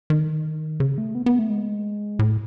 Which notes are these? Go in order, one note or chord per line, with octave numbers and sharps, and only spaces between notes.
D#3
C#3
A3
B3
B3
A3
G#3
A2